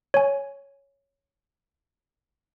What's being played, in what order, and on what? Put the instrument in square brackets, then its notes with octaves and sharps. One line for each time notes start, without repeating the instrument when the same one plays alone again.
[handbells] C#5 G#5